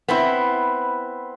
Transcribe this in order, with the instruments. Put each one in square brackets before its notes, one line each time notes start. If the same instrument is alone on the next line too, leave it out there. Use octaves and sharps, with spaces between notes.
[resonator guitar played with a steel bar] B3 C4 E4